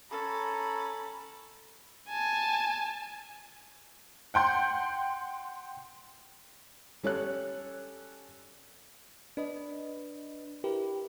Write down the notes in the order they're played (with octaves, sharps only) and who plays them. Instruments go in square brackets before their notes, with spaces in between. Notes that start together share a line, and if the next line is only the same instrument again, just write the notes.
[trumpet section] C#4 A#5 [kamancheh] A4 B5
[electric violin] G#5 A5
[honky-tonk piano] F#5 G5 C6 G6
[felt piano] G3 C#4 A4 C#5 F#6
[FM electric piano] D4 B4 D#5
E4 G4 A#4 B4